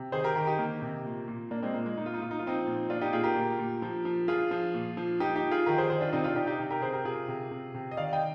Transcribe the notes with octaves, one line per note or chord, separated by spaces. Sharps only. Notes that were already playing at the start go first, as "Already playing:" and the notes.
Already playing: C3
D#3 G#4 C5
G4 A#4
D#3 G4 A#4
D#4 G4
D#3 A#3
C3
A#2
A#2
A#2 A#3 D4
G#3 C4
A#2 A#3
G#3
A#2 D#4
F4
D#4
A#2 F4
D#4
F4
F3 C4 D#4
A#2
A#2 D4 F4
D#4 G4
A#2 F4 G#4
G4 A#4
A#2
A#2
F3
F3
F3 F4 G#4
F3
A#2
F3
F3 D#4 G4
D#4 G4
F3
F4 G#4
D#3 G4 A#4
G#4 C5
D#3 G#4 C5
D4 F4
C3 C4 D#4
D4 F4
C3 D#4 G4
D#4 G4
C3
G4 A#4
C3 G#4 C5
G4 A#4
C3 F4 G#4
C3
C3
C3
D#5
D#3 D5 F5
D#5 G5